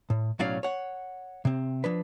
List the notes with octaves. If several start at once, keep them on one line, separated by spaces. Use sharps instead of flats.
A2
B1 A2 F#3 C#4 D5 F5
C#5 F#5
C3 C4
F3 D4 B4